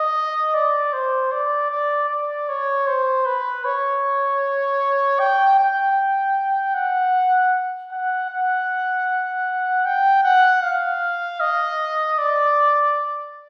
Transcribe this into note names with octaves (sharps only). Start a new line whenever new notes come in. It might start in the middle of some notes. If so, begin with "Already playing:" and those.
Already playing: D#5
D5
C5
D5
D5
D5
C#5
C5
B4
C#5
G5
G5
F#5
F#5
F#5
G5
F#5
F5
D#5
D5